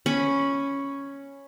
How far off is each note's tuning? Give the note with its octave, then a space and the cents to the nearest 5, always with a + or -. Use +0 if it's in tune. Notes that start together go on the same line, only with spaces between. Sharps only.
C#4 +0 B5 +0